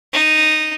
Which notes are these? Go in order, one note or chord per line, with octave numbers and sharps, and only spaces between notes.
D#4